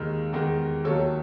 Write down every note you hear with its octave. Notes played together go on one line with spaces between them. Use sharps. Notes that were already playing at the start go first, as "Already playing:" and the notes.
Already playing: D#2 D#3 G#3
E2 D#3 G#3
D#2 D#3 F#3 A4 C#5